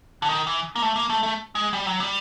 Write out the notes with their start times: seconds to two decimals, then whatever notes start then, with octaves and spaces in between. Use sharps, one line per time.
0.22 D3
0.28 D#3
0.47 E3
0.76 A#3
0.82 A3
0.96 A#3
1.09 A3
1.23 A3
1.55 G#3
1.73 G3
1.87 F#3
2.00 G3